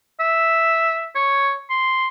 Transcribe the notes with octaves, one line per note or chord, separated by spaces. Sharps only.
E5
C#5
C6